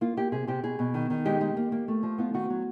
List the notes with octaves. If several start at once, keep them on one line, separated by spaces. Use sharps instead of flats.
A#3 F4
A#3 G4
C3 G#4
C3 G4
B2 G#4
B2
D#3
D#3
G#3 G4
G#3
A#3
A#3
A3
F3
B3 F4
D#3 F#4
F#3